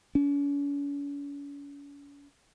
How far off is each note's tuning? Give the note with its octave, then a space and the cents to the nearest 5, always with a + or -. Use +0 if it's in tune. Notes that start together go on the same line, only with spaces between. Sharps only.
C#4 +45